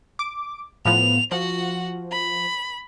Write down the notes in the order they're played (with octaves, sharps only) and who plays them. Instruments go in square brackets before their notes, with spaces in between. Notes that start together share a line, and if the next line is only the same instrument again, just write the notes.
[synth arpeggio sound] D6
[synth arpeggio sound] A2 F3 B3 [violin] F7
[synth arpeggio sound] F3 [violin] F#4 F#5
[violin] B5